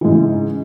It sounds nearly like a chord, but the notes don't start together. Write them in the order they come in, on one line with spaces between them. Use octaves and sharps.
E3 G#2 C#3